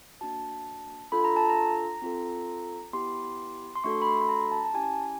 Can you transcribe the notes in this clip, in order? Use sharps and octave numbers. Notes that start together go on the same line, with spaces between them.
A#3 D4 F#4 A5
D4 F4 A4 B5
A#5
A5
A#5
C4 F4 A4
B3 E4 G4 C6
C6
A3 D4 F#4 A4 C#6
B5
C6
B5
A#5
A5
A5
C#4 E4 G4 G#5